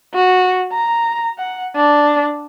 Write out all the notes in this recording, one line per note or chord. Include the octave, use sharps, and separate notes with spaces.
F#4
A#5
F#5
D4